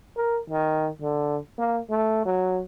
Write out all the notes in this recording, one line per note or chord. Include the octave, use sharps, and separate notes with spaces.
A#4
D#3
D3
A#3
A3
F#3